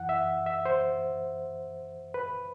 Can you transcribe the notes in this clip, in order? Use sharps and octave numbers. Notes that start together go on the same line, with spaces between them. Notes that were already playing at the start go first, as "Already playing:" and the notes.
Already playing: F#2 E3 F#5
E5
E5
C5
B4